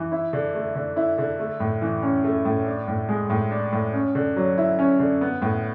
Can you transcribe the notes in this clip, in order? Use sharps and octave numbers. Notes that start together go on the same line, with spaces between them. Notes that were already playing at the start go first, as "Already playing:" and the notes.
Already playing: E3
E4
D3
A3
D3
E4
D3
A3
A2
E3
C#4
A3
A2
D4
A2
G#3
A2
D4
A2
C#4
D3
F#3
E4
C#4
D3
B3
A2